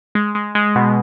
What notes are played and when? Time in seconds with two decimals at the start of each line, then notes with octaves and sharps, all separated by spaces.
0.15 G#3
0.35 G#3
0.55 G#3
0.75 B2